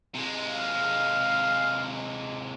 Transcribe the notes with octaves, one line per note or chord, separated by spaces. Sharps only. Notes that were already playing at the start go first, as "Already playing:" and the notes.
C3 G#3
F5